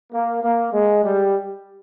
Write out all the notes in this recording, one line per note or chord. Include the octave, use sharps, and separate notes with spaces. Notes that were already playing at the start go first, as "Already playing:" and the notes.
A#3
A#3
G#3
G3